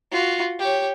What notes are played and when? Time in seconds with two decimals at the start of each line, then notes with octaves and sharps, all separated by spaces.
0.11 F4 F#4
0.59 G4 C#5